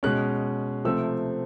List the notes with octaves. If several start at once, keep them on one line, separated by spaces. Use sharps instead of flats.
B2 G#3 C#4 F#6
C3 F3 A3 C4 E6